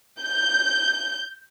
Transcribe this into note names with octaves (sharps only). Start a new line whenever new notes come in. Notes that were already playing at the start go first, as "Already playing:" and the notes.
G6